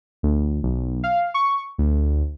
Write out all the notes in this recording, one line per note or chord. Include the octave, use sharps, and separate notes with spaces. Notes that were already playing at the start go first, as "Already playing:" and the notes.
D2
B1
F5
C#6
D2